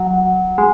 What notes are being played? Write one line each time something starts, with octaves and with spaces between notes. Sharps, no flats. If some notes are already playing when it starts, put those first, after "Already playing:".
Already playing: F#3
G#3